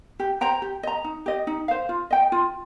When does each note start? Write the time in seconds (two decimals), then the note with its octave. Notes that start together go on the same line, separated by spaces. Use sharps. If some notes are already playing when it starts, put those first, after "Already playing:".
0.20 G4
0.41 C5 G5 A#5
0.62 G4
0.83 D#5 A#5
1.04 D#4
1.26 G4 D#5
1.47 D#4
1.68 C5 F5
1.89 F4
2.11 D#5 G5
2.32 F4